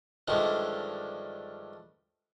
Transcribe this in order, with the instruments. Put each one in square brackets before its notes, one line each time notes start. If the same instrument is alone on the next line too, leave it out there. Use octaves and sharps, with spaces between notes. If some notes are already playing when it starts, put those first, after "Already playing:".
[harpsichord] G2 D3 D#3 F3 G#3 A3